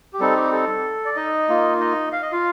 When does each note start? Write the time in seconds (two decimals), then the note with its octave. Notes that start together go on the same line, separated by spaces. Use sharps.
0.13 G4
0.20 G3 C4 D#4 A4
0.36 G4
0.53 A4
1.05 D5
1.16 D#4 D#5
1.49 A#3 F4
1.80 D#4 D#5
2.12 F5
2.22 D#5
2.32 F4 F5